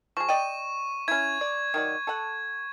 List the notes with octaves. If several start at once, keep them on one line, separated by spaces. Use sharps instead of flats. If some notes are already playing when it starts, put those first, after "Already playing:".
F3 G#4 C#6
D5 D#5 G5 D#7
C#4 E4 G#6
D5
D#3 F#3 D5
A4 F#5